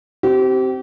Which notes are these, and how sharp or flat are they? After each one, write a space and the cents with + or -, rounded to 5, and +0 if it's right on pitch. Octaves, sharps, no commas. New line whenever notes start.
C4 +0 G4 -35